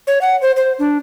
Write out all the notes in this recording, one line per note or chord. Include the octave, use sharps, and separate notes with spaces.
C#5
F#5
C5
C5
D4